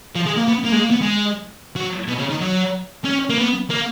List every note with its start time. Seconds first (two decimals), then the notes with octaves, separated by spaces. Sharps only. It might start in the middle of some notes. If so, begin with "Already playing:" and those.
0.15 F3
0.26 G#3
0.37 A#3
0.48 B3
0.64 A#3
0.72 G#3
0.80 A#3
0.91 B3
1.02 G#3
1.76 F#3
2.08 B2
2.19 C#3
2.30 D#3
2.41 F#3
3.05 C#4
3.29 A#3
3.38 B3
3.70 A#3